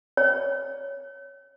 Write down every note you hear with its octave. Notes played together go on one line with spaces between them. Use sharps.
C#5